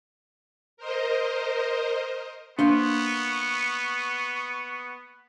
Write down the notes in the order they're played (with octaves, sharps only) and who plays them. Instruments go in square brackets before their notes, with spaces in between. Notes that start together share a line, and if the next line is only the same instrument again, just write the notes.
[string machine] A#4 C5 D#5
[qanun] A#3 C5 [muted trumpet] B3 [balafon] D4 [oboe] C#6